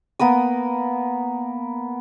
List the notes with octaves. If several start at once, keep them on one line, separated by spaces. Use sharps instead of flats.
A#3 B3 A#4 D#6